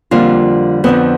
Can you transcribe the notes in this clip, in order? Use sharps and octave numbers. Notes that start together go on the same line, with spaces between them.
F2 D3 G3 A#3 F4
F2 D3 F3 B3